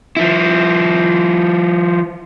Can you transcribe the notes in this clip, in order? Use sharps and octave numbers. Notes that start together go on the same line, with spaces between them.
F3 E4